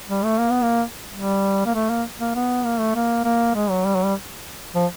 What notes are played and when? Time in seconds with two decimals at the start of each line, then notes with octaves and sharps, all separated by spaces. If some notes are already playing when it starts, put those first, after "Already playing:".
0.09 G3
0.24 A3
0.39 A#3
0.50 B3
0.62 A#3
1.14 G3
1.66 A#3
1.74 A3
1.89 A#3
2.20 A#3
2.35 B3
2.65 A#3
2.80 A3
2.95 A#3
3.25 A#3
3.55 G#3
3.70 F#3
3.85 G3
3.95 F#3
4.05 G3
4.75 F3